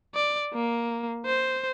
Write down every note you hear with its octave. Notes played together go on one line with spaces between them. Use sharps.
D5
A#3
C5